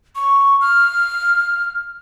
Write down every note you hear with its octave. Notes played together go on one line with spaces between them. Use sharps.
C#6
F6